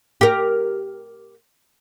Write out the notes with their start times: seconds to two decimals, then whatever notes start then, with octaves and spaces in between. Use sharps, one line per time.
0.21 G4 A#4